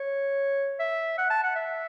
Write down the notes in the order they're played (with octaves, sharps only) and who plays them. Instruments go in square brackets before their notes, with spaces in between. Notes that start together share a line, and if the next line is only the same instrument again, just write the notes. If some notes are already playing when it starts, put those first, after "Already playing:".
Already playing: [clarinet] C#5
E5
F#5
A5
F#5
E5